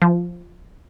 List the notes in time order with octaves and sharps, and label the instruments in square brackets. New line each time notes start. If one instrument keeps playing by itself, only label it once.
[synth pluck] F3